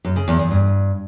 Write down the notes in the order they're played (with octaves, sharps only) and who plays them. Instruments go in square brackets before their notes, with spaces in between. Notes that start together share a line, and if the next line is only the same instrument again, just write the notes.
[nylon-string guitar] F#2
C#3
E2
E2
G2